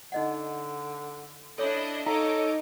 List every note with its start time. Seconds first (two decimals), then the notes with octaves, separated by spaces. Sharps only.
0.12 D3 D#4 D#5 F#5
1.58 D4 E4 A4 C#5 D#5 D6
2.06 D#4 A4 C#5 D#5 F5 D6